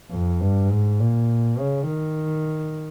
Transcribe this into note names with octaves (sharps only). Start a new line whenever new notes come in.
F2
G2
G#2
A#2
C#3
D#3